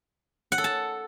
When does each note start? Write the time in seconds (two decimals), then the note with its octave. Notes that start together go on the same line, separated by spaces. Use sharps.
0.52 F#5
0.58 A4
0.64 A5